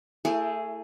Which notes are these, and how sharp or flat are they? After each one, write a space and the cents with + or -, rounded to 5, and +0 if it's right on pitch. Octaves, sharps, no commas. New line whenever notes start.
A3 +30 E4 +10 G#4 +0